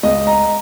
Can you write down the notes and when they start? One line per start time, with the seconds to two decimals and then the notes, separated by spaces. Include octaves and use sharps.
0.03 C#2 D#5
0.27 A#5